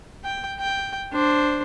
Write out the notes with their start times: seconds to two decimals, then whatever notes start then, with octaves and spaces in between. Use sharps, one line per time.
0.24 G5
0.59 G5
1.12 D4 C5